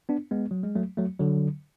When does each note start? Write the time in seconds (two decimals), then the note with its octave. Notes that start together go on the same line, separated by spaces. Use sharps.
0.09 B3 D4
0.31 G#3 B3
0.51 F#3
0.63 G#3
0.75 F#3 A3
0.97 F#3 A3
1.20 D3 F#3